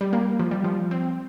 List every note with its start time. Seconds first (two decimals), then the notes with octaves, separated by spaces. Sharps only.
0.01 G3
0.13 A#3
0.40 F3
0.51 G3
0.64 F3
0.91 C4